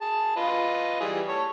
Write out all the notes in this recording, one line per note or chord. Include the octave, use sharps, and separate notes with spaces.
G#4 A5
F4 B4 D#5
E3 G3 G#4
A4 C#5